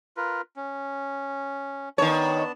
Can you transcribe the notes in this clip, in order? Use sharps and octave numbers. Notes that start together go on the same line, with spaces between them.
F4 A#4 B4
C#4
D#3 B3 D4 C#5 A5